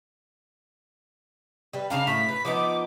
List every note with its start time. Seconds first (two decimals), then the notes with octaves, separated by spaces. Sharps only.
1.73 G3 B4
1.90 C#3 D4 A#4 F5
2.07 A2 B6
2.29 B4
2.45 F3 B3 D#4 D6